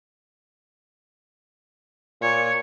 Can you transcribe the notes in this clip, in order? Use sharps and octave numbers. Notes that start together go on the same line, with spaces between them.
A#2 C#5